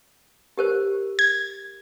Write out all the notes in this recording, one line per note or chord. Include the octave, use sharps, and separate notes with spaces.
G4 A#4 C5
G#6